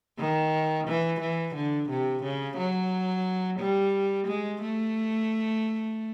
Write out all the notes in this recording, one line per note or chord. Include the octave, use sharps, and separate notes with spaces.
D#3
E3
E3
D3
C3
C#3
F#3
G3
G#3
A3